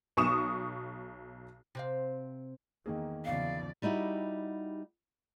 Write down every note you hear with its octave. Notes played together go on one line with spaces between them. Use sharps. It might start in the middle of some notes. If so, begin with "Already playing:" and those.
B1 C#6 D#6 E7
C3 C4 F5
E2 D#3 A#3 G#4
E2 C#3 F3 D5 F5
G3 D#4 E4 F#4 G4